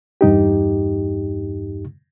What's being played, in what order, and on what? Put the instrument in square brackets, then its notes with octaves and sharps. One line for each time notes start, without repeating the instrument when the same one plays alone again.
[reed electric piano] E2 G2 D#4 G4